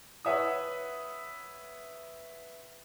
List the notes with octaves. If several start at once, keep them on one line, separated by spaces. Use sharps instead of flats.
B4 C#5 E5 F#5 D#6